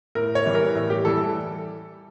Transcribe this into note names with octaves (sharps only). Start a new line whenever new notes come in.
A2 A#4
C#5
E3 G3
A#4
A2
G4
E3 G3 A4